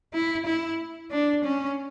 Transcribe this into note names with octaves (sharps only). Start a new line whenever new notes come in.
E4
E4
D4
C#4